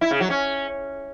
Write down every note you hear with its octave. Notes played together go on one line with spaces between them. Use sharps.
E4
C#3
F#3
C#4